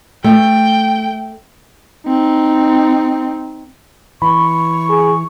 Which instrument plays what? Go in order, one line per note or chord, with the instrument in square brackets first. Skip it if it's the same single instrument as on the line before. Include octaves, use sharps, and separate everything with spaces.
[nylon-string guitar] A3 [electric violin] G5
[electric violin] C4 D#4
[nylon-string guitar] E3 [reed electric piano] B5 [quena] C#6
[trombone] G#4